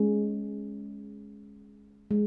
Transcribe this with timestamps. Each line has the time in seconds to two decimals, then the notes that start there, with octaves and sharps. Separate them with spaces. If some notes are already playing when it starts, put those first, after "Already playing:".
Already playing: G#3 C#4
2.11 G#3